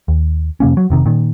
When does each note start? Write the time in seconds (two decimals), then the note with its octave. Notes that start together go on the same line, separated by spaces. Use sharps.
0.08 D#2
0.60 F2 C3 A#3 C#4
0.77 F#3
0.90 F1 C3 D#3
1.06 A#2 D#3